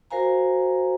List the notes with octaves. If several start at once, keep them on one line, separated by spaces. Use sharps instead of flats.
F#4 A#4 C5 F5 G#5 A#5